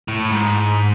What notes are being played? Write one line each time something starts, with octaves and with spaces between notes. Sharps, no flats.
A2
G#2